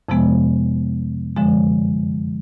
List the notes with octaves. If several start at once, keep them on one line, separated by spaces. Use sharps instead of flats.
F2 C3 F3 G#3 B3
F#2 D3 F3 G#3